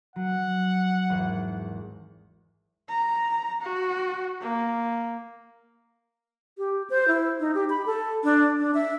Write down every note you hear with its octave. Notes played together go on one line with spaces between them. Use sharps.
F#3 F#5
G#1 E2
A#5
F#4
A#3
G4
C5
E4
D#4
G4
B5
A4
D4
D4
E5